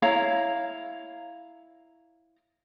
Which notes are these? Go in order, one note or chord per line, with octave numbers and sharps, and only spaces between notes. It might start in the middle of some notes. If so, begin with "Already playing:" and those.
E4 C#5 F5 A#5